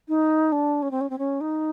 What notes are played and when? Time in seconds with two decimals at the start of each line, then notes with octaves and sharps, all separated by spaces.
0.08 D#4
0.52 D4
0.82 C#4
0.91 C4
1.01 C#4
1.10 C4
1.18 C#4
1.41 D#4